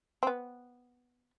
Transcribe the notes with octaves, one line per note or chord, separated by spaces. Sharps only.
C4
B3